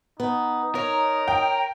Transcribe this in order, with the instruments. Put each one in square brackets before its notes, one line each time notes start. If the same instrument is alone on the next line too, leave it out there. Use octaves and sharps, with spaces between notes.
[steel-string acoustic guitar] B3 [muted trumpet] D#4
[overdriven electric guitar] A#4 [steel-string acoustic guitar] C#5
[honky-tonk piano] G5